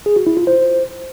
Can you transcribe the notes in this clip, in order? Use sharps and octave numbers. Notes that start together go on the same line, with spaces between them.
G#4
F#4
E4
F4
C5